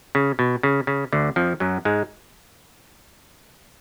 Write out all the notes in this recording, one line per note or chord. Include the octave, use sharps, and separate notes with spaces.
C#3
B2
C#3
C#3
D2 D3
F2 F3
F#2 F#3
G#2 G#3